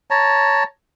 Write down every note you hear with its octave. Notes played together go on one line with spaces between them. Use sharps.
C#5 A5 A#5